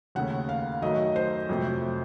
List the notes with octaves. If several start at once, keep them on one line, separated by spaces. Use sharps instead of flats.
D#2 C#3 A3 F#5
F5
F#2 D#3 F#3 A3 D#5
C5
F2 C3 F#3 A3